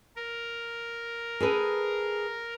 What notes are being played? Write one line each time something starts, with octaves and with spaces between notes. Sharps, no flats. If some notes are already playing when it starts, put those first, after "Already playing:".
A#4
G#4 A4 B4